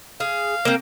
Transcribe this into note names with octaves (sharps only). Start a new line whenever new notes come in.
G#4 F5
A#3 C4